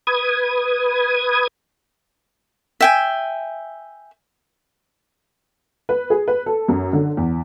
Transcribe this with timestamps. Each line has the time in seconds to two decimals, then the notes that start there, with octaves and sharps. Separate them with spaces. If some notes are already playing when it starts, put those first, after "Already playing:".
0.07 B4 D#6 G#6
2.81 E5 G5 G#5
5.89 B4
6.10 G#4
6.28 B4
6.46 A4
6.69 F#2
6.93 D3
7.17 E2